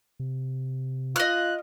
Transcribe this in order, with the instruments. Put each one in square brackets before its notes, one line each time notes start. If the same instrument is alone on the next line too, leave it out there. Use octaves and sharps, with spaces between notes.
[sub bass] C3
[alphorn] F4 [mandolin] D#5 F6 [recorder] F#6